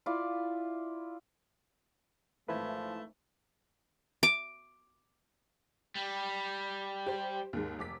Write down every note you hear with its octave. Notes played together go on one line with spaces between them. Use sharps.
E4 F4 D5
G#1 E3 F3 A3 B4 B5 G#6
D6
G3
G4 C5
D#2 G#2 G#3
F1 D6 B6